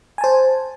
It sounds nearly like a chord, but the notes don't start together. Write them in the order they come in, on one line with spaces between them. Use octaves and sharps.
G#5 A5 C5